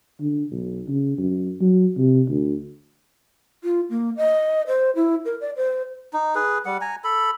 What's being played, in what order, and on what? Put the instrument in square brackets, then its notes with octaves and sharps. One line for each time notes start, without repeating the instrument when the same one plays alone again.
[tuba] D3
B1
C#3
F#2
F#3
C3
D2
[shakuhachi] F4
A#3
D#5
C5
E4
A#4
D5
C5
[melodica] D#4
G#4 B4
G3 F#5
G#5 A#5
A4 B5